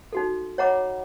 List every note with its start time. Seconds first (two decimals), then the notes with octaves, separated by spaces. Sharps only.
0.13 D#4 F#4 A4
0.58 C#5 D#5 F#5 A#5 B5 D6